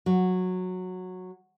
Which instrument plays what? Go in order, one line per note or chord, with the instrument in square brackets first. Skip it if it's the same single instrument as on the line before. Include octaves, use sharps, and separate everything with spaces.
[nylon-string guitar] F#3